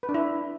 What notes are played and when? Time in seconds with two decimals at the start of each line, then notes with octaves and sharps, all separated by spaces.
0.03 B4
0.09 D4
0.14 E4